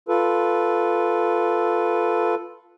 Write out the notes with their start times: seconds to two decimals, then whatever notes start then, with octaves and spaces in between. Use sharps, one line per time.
0.09 F4 A4 B4